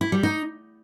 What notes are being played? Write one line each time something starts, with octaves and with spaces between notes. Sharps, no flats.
E4
G3
D#4